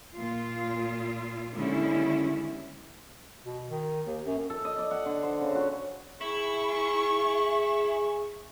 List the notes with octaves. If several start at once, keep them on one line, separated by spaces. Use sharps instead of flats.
A#2 F4
D#2 D3 G3 G#3 C#4 E4
B2
D#3
D#2
F#2
A4
D#5
D5
F#5
D3
C5
C#3
F#4
E4 G#4 C#6